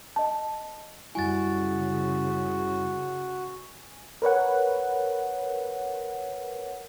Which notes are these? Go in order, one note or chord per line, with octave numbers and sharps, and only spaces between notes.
D#5 A5
F#2 C#3 G3 E4 F#4 G#5 A6
A#4 B4 C#5 F#5